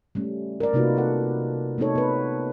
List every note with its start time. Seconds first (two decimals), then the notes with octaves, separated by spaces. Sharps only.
0.15 G3 A3 C#4
0.60 A#4 D5
0.74 C3 A#3 D#4 F4 F#4 B4
0.97 A4 A#4 F#5
1.78 A3 B3 C4 D#4 A4 C#5
1.95 B3 B4